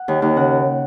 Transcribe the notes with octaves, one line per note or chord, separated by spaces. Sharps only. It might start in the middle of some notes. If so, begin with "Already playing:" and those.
Already playing: F#5
D#2
D#2
C#3 F#5